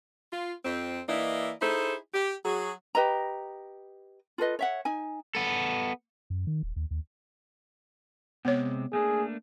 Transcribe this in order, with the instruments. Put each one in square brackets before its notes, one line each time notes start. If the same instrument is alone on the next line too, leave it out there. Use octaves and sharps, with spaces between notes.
[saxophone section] F4
F2 C4
E3 A#3 E4 D5 D#5
D#4 E4 G#4 A4 C5
G4
F#3 F#4 G#4
[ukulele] G4 B4 D#5 A#5
F4 A4 B4 D#5
C#5 E5 F#5
D#4 G#5
[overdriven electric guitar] B3 A4
[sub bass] F#2
D#3
D#1
D#2
D#2
[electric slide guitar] C3 G#3 C4 [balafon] B3 C#5
[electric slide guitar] A3 A#3 D4 [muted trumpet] G#4